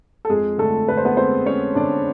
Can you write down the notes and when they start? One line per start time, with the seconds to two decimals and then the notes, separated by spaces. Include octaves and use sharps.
0.25 A4
0.30 F2 G#3 G#4
0.58 D3 A3 A4
0.88 D3 B4
0.97 C5
1.05 B3 B4
1.17 G#3 C4 C5
1.46 G#3 C#4 C#5
1.75 D3 D4 D5